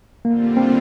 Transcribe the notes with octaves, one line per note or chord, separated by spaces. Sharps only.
D3 G3 A#3 C4 F4
C4